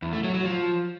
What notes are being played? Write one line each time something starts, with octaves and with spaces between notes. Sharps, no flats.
E2
A3
F#3
F#3
F3